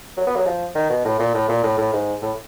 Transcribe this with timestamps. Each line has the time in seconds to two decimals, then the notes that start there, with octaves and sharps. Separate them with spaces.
0.17 F#3
0.27 B3
0.36 F#3
0.46 F3
0.75 D#3
0.90 B2
1.05 A2
1.20 A#2
1.34 A2
1.49 A#2
1.64 A2
1.78 A2
1.93 G#2
2.22 A2